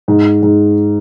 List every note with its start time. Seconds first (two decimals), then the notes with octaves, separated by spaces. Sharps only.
0.08 G#2
0.43 G#2